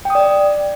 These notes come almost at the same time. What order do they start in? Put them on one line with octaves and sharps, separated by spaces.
G5 D#6 D5